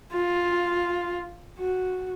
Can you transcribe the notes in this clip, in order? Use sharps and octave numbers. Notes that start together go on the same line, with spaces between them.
F4
F#4